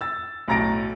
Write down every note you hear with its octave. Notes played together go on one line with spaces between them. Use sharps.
E6 A6
B1 A2 A#5 A6 A#6 D7